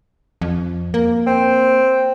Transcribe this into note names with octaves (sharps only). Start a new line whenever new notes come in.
F2
A#3
C4